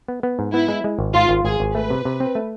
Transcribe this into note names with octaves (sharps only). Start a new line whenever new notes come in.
B3
B3
G#2
B3 E4
G#3
G#3
G#1
G#2 F4
G#1
G#1 G#4
G#1
A3 B4
C3
C3
C4
A3